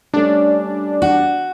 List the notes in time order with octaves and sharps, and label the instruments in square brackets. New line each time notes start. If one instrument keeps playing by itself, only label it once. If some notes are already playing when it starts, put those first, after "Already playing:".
[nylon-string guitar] G3 A3 C#4 [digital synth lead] D4
[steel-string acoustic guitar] F#4